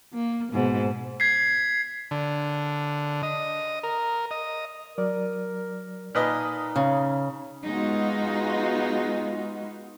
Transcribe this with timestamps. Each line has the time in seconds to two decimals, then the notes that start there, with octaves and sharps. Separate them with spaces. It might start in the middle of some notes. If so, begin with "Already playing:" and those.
0.13 A#3
0.53 G#2 B2
1.20 G#6 B6 C7
2.11 D3
3.23 D#5
3.83 A#4
4.31 D#5
4.98 F#3 A#4 D5
6.15 A#2 D#4 B4 D#5 A5 D#6 F6
6.76 C#3
7.63 G#3 B3 D#4 F4 F#4